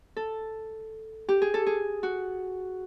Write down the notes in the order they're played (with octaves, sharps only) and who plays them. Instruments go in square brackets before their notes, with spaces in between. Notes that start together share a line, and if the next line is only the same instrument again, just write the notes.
[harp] A4
G4
G#4
A4
G#4
F#4